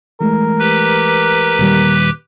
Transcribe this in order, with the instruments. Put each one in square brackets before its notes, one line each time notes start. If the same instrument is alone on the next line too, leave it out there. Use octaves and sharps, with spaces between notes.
[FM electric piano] E3 G#3 A3 [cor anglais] A#4
[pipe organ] G4 B4
[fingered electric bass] D#1 D#2 G3